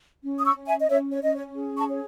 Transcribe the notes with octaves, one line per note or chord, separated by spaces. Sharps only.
C#4
D#6
C#6 E6
C#4
E5 G#5
D#5
C#4 C#5 E5
C#5
C#4 D#5
C#5
G#4
A5 C#6
C#5